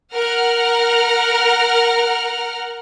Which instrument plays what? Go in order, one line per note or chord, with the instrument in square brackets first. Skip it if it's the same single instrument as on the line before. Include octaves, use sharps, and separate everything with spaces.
[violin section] A#4 F#5 F6